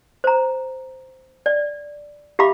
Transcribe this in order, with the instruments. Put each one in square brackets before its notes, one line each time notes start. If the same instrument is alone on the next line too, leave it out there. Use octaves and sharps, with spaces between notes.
[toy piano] C5 A#5
D5
G4 E5 F5 B5 D6